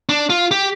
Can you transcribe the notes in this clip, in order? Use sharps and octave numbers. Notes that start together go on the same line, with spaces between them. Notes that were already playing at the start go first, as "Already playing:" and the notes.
D4
F4
G4